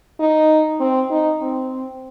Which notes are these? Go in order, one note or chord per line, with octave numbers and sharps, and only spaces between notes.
D#4
C4
D#4
C4